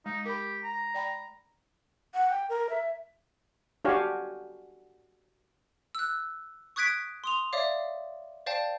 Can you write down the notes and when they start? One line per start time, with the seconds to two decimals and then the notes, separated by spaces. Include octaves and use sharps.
0.06 G#3 D#4
0.25 G4 A#4 B5
0.64 A#5
0.94 D5 G5 B5
2.14 F#5
2.30 G5
2.49 A#4
2.70 E5
3.85 D4 F#4 G4 C#5 F5 G#5
5.95 E6 F#6
6.76 C#6 D#6 F#6 G#6 B6 D7
7.24 C6 D#6 F7
7.53 C#5 D5 E5 F5 D6
8.46 C5 D5 F5 G5 A5